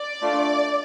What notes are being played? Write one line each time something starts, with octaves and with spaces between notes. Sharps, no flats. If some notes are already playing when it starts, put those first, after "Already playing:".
Already playing: D5
A3 D4 F4